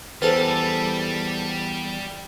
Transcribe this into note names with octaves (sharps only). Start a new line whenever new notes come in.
E2 G3 A4 B4 C5 A6 D#7